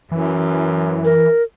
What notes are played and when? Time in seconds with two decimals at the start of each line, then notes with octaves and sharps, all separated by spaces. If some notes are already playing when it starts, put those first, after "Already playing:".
0.11 F#2 E3
1.05 A#4